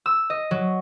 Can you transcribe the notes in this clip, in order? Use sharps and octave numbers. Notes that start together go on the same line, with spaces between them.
E6
D#5
F#3